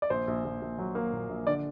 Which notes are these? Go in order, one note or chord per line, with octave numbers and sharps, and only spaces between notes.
D5
A#1 C5
A#1
A#1
A#1
F#3
A#3
A#2
A#1
D3 D5